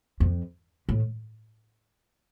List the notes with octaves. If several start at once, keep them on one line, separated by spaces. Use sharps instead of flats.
F2
A2